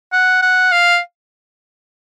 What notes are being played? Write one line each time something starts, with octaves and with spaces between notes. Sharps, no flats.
F#5
F#5
F5